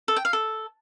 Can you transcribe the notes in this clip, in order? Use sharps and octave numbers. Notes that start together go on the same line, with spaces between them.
A4
G5
F5
A4